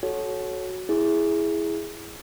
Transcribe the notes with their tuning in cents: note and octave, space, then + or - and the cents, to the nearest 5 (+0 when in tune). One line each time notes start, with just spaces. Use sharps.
F#4 +0 A4 -25 C#5 -5
E4 +0 G#4 +0